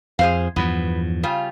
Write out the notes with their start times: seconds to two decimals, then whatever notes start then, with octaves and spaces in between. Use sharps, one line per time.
0.19 F2 G#4 C5 F5
0.56 E2 G2 F3 B3
1.23 C#3 G3 F4